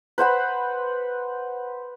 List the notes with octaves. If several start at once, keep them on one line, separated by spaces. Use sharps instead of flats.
B4 C5 F#5 B5